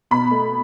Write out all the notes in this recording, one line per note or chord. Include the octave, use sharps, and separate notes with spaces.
B2 B5
A3